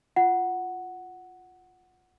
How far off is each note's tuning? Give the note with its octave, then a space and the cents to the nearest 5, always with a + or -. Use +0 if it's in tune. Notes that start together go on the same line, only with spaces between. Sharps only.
F4 +0 F#5 +0